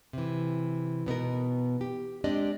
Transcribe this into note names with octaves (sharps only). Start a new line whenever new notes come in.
C3 E3
B2 B3 D#4 A#4
G4
G#3 C4 D4 G4 D5 D#5